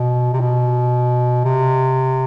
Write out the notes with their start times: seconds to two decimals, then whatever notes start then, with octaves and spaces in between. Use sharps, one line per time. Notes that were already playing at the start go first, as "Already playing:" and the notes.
Already playing: B2
0.33 C3
0.40 B2
1.45 C3